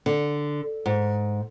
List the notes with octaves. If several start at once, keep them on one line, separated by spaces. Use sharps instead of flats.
D3
G#2